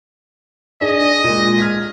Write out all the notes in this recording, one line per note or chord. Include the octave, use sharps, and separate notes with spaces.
D4 G#4 D#5
A#2 G#3
F6 G#6 B6